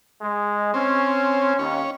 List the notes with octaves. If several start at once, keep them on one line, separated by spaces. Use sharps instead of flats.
G#3
C4 C#4
D#2 C#4